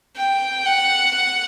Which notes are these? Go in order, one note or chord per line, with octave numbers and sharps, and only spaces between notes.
G5
F#5
F#5